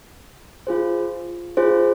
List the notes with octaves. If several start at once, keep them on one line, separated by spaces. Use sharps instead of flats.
F4 G#4 C5
F4 G#4 C5